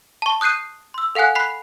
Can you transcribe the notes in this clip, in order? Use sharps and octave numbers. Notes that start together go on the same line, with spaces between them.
A5 C#6
D#6 F#6 G6 C7 D#7
C6 E6
A4 F5 F#5 G#5 F#6
B5 F#6 B6 C7 F7